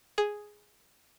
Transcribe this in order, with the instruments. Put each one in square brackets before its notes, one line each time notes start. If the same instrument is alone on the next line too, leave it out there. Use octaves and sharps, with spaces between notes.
[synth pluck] G#4